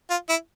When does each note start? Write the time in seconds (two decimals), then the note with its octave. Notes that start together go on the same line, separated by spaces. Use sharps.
0.10 F4
0.29 E4